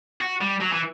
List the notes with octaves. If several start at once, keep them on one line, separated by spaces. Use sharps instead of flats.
F#4
G3
F#3
E3